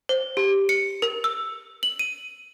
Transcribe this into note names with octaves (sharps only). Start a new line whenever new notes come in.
C5
G4
C#7
A#4
E6
F#7
D#7